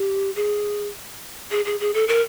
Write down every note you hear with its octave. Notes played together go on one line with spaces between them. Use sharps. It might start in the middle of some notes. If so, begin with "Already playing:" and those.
Already playing: G4
G#4
G#4
G#4
G#4
A4
A#4